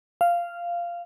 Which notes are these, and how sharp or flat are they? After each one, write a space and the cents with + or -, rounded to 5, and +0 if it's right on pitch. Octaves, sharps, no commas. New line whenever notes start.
F5 -10